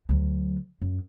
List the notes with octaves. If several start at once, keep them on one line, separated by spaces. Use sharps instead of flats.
D2 F#3
F#2